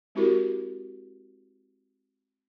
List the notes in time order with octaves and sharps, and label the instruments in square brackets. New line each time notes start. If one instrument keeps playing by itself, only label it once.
[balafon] G#3 C4 E4 F#4 G4 A#4